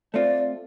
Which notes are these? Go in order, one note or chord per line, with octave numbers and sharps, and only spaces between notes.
A3 C4 F4 D5